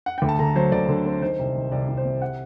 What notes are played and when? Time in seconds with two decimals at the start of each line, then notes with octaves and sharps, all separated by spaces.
0.06 F#5
0.18 D2 G5
0.29 A5
0.39 D3 A#5
0.56 F#3 C5
0.72 D2 D5
0.89 D3
1.06 C4
1.21 D#3 C5
1.39 C2
1.56 D#3
1.71 C2 D5
1.88 C2
1.97 C5
2.05 C3
2.22 F#5